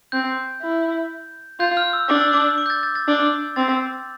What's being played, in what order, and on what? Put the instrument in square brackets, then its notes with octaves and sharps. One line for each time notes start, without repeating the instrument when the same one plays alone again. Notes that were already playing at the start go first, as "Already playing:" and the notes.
[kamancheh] C4 [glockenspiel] G6
[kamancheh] E4
[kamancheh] F4 [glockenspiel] G6
[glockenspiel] F6
E6
[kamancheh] D4 [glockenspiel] D6
[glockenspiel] E6
D6
E6
D6
G6
A6
A6
A6
[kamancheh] D4
[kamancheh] C4 [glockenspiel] A6